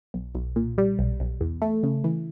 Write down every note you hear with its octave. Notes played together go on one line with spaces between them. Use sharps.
B1
B1
A#2
G3
B1
B1
E2
A3
C#3
E3